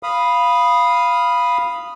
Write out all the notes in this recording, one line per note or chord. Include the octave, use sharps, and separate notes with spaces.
F5 B5 D#6